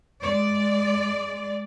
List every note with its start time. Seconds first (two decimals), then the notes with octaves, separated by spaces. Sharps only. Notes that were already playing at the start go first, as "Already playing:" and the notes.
0.21 G#3 D5